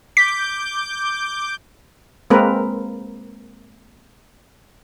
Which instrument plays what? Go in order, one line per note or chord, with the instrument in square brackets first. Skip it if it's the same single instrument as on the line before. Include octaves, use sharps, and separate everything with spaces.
[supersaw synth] D6 G6 [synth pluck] B6
[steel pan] G#3 A#3 C4 A#4 B4